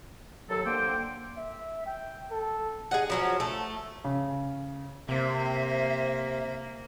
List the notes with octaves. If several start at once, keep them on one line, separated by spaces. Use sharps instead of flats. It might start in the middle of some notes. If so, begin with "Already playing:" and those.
D#2 F#3 A4
D3 A#3 C5 G5
E5
G5
A4
G#4 D#5 F#5
F3 F#3 C#4
A3
C#3
C3 A#3 C5 E5